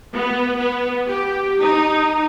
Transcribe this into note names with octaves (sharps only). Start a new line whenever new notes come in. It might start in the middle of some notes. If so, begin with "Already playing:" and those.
B3
B3
G4
D#4